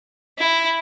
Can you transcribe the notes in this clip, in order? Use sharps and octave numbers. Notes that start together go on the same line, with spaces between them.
E4